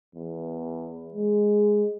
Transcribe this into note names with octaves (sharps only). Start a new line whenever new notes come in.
E2
G#3